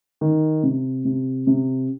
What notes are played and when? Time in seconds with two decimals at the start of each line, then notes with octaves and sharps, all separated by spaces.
0.21 D#3
0.63 C3
1.05 C3
1.47 C3